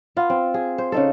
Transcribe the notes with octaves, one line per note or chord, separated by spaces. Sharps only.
B3 F4
C4
G#4
C5
C#3 D#4 A4